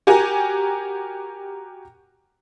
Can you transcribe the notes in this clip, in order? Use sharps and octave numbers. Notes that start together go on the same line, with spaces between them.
F#4 G4 A#4 G#5